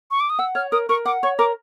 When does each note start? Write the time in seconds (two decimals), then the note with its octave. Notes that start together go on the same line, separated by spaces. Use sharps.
0.11 C#6
0.20 D6
0.30 D#6
0.39 F#5 E6
0.55 C#5 F6
0.72 A#4 D#6
0.89 A#4 C#6
1.06 F#5 D6
1.23 C#5 C#6
1.39 A#4 D6